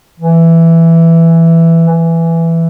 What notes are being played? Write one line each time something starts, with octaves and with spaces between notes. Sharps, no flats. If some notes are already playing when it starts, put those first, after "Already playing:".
E3
E3